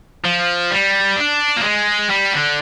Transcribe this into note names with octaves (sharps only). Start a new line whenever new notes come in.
F3
G3
D4
A#3
G#3
G3
D3